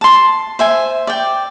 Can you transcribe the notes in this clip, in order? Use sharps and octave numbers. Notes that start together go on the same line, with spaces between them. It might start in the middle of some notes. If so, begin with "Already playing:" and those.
A5 C6
C5 E5 G#5
D5 G5